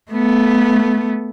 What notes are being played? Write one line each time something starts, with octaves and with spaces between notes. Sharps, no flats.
A3 B3